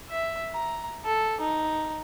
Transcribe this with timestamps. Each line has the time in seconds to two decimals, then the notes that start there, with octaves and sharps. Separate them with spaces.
0.10 E5
0.54 A#5
1.05 A4
1.41 D#4